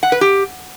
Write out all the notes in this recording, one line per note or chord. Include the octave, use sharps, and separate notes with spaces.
F#5
B4
G4